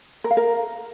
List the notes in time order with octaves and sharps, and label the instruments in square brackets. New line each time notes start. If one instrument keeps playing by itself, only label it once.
[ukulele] A#4
F5
A#4